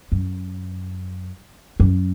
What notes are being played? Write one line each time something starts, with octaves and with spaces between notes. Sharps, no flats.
F#2
F#2